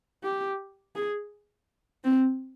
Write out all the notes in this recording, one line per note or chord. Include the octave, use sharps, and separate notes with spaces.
G4
G#4
C4